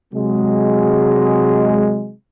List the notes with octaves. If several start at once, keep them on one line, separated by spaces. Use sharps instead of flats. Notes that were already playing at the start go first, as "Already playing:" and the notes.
C3 F#3 G#3